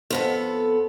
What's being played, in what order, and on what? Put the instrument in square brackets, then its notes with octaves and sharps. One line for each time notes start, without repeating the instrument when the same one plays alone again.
[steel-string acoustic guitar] F2 B3 A4